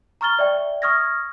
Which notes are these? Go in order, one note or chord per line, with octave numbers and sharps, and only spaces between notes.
A#5 C#6 F6 A6 G7
D5 E5 G5
C#6 D#6 F6 G#6 A#6